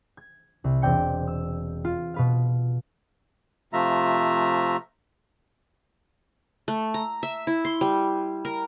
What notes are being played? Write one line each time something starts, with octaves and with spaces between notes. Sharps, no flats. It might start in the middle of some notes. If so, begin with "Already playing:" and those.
G#6
C2
E1 C4 D5 G5 C#7
E6
F4
B2 B4 F5
C3 F3 A3 F4 E5 A#5
A3
A#5
E5
E4
C6
G3
A#4